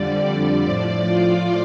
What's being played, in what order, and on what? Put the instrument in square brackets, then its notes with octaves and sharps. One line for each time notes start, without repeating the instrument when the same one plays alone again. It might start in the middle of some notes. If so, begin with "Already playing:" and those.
Already playing: [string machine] F2 D3 G3 D5
A2 F3 D5
F4